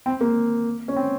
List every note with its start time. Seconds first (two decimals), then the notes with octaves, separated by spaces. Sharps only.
0.06 C4
0.21 A#3
0.88 C#4
0.96 C4